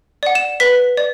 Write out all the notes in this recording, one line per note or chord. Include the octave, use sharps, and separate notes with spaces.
D5 F#5
E7
B4 B6
D5